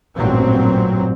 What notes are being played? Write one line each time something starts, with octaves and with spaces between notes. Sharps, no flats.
A1 G2 A#2 F#3 C4